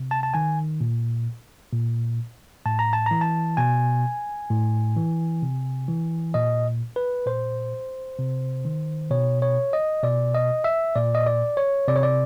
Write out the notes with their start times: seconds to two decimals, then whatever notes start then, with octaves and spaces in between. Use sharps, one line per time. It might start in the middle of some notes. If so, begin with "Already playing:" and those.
Already playing: C3
0.11 A5
0.23 A5
0.34 D#3 G#5
0.81 A#2
1.73 A#2
2.66 A2 A5
2.79 A#5
2.93 A5
3.06 E3 A#5
3.21 A5
3.57 B2 G#5
4.50 A2
4.96 E3
5.42 C3
5.88 E3
6.34 A#2 D#5
6.96 B4
7.26 A#2 C5
8.19 C3
8.65 D#3
9.11 B2 C#5
9.42 C#5
9.73 D#5
10.03 B2 D5
10.34 D#5
10.64 E5
10.96 A#2 D5
11.15 D#5
11.26 D5
11.57 C#5
11.88 C3 D5
11.96 C#5
12.03 D5